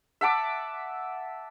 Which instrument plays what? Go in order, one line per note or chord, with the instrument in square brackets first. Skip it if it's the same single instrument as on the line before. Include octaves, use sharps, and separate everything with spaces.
[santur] E5 F#5 A5 D6